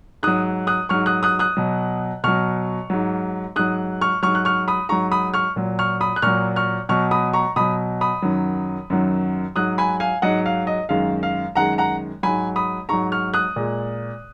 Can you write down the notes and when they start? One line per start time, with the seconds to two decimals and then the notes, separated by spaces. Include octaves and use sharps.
0.23 G#2 F#3 D#6 F#6
0.67 D#6 F#6
0.89 G#2 F#3 C#6 F6
1.06 D#6 F#6
1.23 D#6 F#6
1.39 D#6 F#6
1.57 B2 F#3
2.24 B2 F#3 C#6 F6
2.90 G#2 F#3
3.56 G#2 F#3 D#6 F#6
4.01 C#6 F6
4.23 G#2 F#3 C#6 F6
4.35 F#6
4.45 C#6 F6
4.68 B5 D#6
4.89 G#2 F#3 A#5 C#6
5.12 B5 D#6
5.34 C#6 F6
5.56 A#2 F#3
5.79 C#6 F6
6.01 B5 D#6
6.16 F#6
6.22 A#2 F#3 C#6 F6
6.56 C#6 F6
6.89 B2 F#3 C#6 F6
7.11 B5 D#6
7.33 A#5 C#6
7.56 B2 F#3 B5 D#6
8.01 B5 D#6
8.22 F#2 D#3 F#3
8.90 F#2 D#3 F#3
9.56 G#2 F#3 D#6 F#6
9.78 G#5 B5
10.00 F5 G#5
10.22 G#2 F#3 D#5 F#5
10.46 F5
10.67 D#5
10.89 F#2 D#3 G#3 F5
11.23 F5
11.55 F#2 D#3 G#3 F#5 A#5
11.78 F#5 A#5
12.23 G#2 F#3 G#5 B5
12.56 B5 D#6
12.89 G#2 F#3 A#5 C#6
13.12 C#6 F6
13.34 D#6 F#6
13.56 A#2 G#3